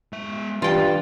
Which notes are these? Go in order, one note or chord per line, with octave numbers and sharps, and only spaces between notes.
G#3 E5
G2 E3 F4 G5